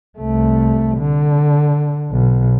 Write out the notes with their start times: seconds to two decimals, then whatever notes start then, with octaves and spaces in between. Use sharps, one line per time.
0.19 C2 A3
0.98 D3
2.11 B1